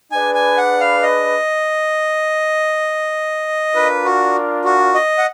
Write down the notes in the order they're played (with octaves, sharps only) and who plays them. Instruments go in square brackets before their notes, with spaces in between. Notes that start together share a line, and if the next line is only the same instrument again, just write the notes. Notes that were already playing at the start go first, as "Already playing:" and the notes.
[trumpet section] D4 G#4 B4 D5 [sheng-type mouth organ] G#5
[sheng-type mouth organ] G#5
F#5
F5
D#5
[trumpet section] D4 F4 A#4 D5 F5 [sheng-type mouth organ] B4
[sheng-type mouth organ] F#4
F#4
D#5
F#5